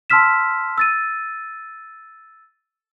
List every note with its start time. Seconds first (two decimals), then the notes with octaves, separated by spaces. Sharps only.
0.10 A5 C6 E6 F6 B6 E7
0.78 E6 A6 D#7